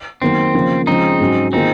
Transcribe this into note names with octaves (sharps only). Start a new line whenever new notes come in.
D#3 F#3 A#3 C4
C#3 F3 A#3
C#3 F3 G#3 C4 D#4
G#2 F#3 C#4 F#4
D#3 A#3 C4 D#4 F4 G#4